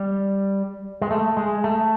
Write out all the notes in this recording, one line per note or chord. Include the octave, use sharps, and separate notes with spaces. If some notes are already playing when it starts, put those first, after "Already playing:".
Already playing: G3
G#3
A3
G#3
A3